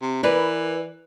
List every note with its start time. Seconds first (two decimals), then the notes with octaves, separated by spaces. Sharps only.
0.02 C3
0.23 E3 A#4 B4 D5